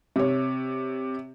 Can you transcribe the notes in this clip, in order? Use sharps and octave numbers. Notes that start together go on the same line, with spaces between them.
C3 C#5